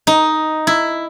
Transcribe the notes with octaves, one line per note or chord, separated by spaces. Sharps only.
D#4
E4